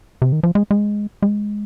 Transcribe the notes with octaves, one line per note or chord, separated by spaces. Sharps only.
C3
D#3
F3
G#3
G#3
G#3